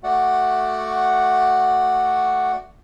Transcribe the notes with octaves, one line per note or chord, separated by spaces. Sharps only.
A3 F#4 D5 F#5